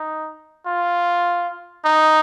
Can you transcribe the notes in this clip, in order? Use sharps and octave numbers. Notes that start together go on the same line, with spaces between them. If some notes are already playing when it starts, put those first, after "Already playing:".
Already playing: D#4
F4
D#4